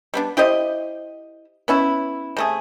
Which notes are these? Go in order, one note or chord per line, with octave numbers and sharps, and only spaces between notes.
G3 B3 D4
E4 G4 C5 D#5
B3 C#4 E4
C3 A3 G#4